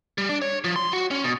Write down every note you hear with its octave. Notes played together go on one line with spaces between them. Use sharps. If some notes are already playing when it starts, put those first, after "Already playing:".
G3
D4
C#5
F3
C6
F#4
C#4
B2